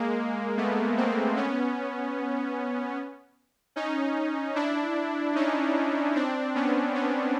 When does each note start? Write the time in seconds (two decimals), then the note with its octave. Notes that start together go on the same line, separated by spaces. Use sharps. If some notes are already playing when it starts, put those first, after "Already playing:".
Already playing: G#3 A#3
0.58 A3 B3
0.97 A#3 C4
1.37 B3 C#4
3.76 C#4 D#4
4.55 D4 E4
5.35 C#4 D#4
6.16 C4 D4
6.55 B3 C#4
6.95 B3 C#4